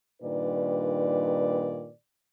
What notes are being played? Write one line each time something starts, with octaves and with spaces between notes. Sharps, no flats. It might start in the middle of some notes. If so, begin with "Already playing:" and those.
G2 A#2 D#3 D#4 B4 D5